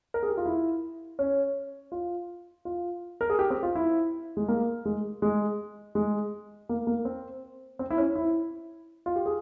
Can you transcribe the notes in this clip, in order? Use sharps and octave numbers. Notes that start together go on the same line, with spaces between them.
A#4
G#4
G4
F4
E4
C#4
F4
F4
A#4
G#4
G4
C4
F4
E4
G#3
A#3
G#3
G#3
G#3
A#3
A#3
C4
C4
E4
C#4
E4
F4
G4
G#4